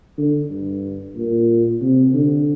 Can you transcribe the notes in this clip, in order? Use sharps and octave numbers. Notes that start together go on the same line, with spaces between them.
D3
G2
A#2
C3
D3